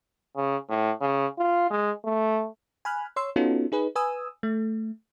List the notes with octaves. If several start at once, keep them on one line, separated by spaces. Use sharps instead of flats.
C#3
A2
C#3
F4
G#3
A3
G#5 B5 F6 F#6
C#5 C6 E6
B3 C#4 D#4 F4 F#4 A4
D#4 G#4 B4
B4 G#5 D#6 E6
A3